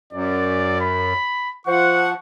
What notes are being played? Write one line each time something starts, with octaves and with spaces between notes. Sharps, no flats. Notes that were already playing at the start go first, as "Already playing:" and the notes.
F#2 D5
B5
F3 C5 F#5 C#6